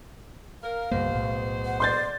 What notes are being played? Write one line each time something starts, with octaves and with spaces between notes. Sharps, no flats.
A#4 F5
C#2 G2 B2 A#3 G#4 C5
B1 A2
F#5
D5 C6 G6 A6